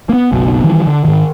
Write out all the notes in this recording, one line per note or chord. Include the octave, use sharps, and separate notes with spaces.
A#3 B3
F#1 B1 B2
D#3 E3 G3
D3
G#2 D#3